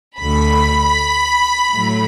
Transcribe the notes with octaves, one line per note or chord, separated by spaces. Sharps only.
D2 D3 A3 B5
A2 F#3 A3